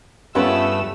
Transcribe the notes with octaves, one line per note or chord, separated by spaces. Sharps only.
G2 A3 B3 C#4 F4 G4 B4 E6